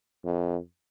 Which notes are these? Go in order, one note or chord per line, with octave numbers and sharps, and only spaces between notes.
F2